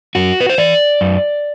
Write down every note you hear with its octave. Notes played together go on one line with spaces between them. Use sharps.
F#2 F#4
B4
C5
E3 D5
F#2